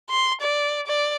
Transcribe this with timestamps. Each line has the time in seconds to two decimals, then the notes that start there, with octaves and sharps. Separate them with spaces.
0.10 C6
0.41 D5
0.87 D5